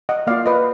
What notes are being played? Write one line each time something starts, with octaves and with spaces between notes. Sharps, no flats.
D#5 F#5
A#3 F4 D5 F5
B4 D#5